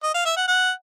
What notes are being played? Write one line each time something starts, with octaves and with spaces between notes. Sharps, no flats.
D#5
F5
E5
F#5
F#5